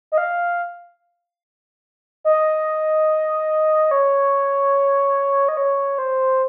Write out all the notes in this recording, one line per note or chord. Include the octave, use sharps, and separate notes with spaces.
D#5
F5
D#5
C#5
D#5
C#5
C5